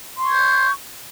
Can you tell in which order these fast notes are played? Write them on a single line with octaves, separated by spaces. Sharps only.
C6 C#6 G#6 G6